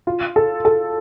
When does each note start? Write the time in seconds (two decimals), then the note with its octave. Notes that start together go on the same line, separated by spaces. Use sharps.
0.07 F4
0.36 A4
0.65 A4